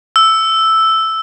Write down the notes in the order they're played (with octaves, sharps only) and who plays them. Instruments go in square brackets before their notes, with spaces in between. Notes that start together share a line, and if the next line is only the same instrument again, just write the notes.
[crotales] E6